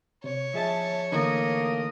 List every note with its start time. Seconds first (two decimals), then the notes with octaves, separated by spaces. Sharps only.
0.24 C3 C#5
0.54 F3 G#4 D#5 E5 A5
1.12 D3 E3 A3 A#3 D#4 D#5